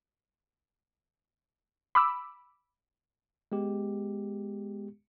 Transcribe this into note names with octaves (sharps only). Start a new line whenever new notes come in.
B5 D6 E6
G#3 B3 G4